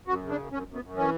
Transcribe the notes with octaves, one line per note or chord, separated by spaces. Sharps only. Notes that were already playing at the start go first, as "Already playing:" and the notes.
F#2 F#4
C#3
D4
F#2
F#2 C#4
F#2
B3
F#2
E3 C#4